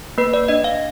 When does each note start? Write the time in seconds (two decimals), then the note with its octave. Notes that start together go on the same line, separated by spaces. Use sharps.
0.18 A#3 B4
0.34 D5
0.48 D4 D#5
0.64 F5